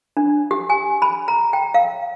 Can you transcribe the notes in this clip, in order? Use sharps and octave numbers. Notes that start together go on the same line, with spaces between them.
D4
G4
G#5
B5
A#5
G5
F5